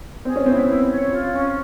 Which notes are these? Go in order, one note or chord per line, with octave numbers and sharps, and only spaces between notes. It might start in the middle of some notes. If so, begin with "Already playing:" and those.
C4 G#4
C#4
C4 E4
B3
E4
C#5
F4
C#4